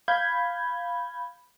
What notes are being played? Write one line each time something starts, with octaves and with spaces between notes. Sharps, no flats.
F5 B5 G6 G#6